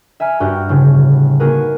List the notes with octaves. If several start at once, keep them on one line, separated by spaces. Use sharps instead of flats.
E5 G#5 A#5 F6
G2 F#4 G4 F6
G1 A2 C#3
A#3 D#4 F#4 G#4 A#4 B4